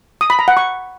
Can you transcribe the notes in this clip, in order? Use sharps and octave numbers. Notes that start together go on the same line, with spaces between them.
D#6
B5
A#5
F#5
C#6